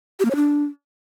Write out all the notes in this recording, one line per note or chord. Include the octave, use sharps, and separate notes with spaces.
G4
A#3
C#5
D4